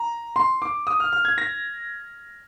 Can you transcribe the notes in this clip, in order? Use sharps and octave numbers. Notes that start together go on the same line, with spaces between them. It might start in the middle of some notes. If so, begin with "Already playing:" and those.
Already playing: A#5
C6
D6
D#6
F6
F6
G#6
A#6